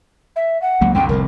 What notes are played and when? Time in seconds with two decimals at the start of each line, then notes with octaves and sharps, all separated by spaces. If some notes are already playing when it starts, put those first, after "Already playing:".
0.36 E5
0.62 F#5
0.81 C#2 F#3 A#3
0.94 C2 F#2 D3 G5
1.09 F1 C2 A2 A#4